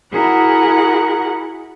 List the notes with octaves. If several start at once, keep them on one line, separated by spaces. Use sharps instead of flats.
E4 F#4 G#4 A#4 F#5